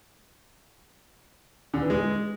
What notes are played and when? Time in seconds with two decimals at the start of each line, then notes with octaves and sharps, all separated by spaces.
1.74 D3
1.82 E3
1.90 G#3